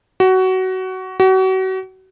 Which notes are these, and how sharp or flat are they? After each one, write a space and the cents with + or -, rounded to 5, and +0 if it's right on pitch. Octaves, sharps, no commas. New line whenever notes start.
F#4 +20
F#4 +35